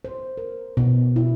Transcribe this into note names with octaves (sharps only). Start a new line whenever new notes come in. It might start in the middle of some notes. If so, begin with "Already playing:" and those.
C5
A#4
B2
E4